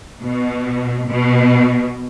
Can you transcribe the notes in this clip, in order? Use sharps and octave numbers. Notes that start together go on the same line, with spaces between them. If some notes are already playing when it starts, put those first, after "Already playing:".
B2
B2